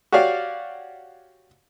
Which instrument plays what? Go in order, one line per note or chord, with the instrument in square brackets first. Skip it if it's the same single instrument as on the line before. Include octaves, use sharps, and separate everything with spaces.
[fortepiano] F#4 G4 C#5 D5 F5